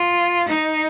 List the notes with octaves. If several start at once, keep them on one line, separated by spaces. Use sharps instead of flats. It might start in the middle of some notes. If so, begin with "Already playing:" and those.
Already playing: F4
D#4